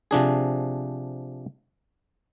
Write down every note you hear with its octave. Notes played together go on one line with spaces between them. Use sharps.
C3 F3 D4 G#4